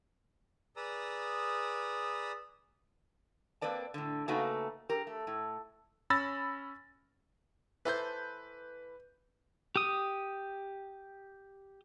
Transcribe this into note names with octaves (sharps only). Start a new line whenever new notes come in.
G#4 B4 D5 A#5 D#6 E6
A#3 C4 B4 D5 A5
A2 D3
C#3 A3 A#3 D#4 F#4 B4
G4 A#4
A3
A2
C#4 B5 E6 A6 A#6
E3 A4 B4 C5 G6
G4 D#6